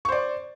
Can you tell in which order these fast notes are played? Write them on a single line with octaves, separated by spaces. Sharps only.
C#6 C5 D5